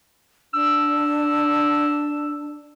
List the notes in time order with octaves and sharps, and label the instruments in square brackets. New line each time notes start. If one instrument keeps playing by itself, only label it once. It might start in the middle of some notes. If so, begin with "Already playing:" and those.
[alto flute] D4 [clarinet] E6